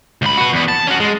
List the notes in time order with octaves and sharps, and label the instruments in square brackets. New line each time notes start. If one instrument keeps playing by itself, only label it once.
[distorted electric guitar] C#2 B5
F#4 B4
E2 B3
A5
C#4 F#4
G#3